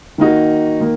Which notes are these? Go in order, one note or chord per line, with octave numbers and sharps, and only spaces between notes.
D#3 A#3 D#4 F#4
D#3 A#3